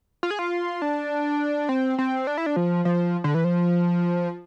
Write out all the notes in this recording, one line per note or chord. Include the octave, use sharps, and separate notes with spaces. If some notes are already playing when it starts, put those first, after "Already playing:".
F4
G#4
F4
D4
C4
C4
D4
E4
D4
F3
F3
D3
E3
F3